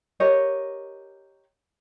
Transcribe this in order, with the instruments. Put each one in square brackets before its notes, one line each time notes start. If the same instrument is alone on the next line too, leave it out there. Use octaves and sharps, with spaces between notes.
[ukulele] G4 A#4 C#5 D#5